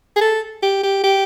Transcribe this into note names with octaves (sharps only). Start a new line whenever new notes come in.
G#4
A4
G4
G4
G4